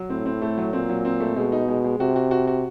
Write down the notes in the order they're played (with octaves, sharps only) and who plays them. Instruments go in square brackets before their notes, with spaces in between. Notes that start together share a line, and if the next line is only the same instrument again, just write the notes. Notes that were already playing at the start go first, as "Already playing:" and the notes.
Already playing: [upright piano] F#3
[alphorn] A2 [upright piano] C4
[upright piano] C4
A3
F#3
[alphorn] A#2 [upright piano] C4
[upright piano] F#3
C4
A3
[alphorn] B2 [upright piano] G#3
[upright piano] D#4
G#3
G#3
[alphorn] C3 [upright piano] F#4
[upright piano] F#4
F#4
F#4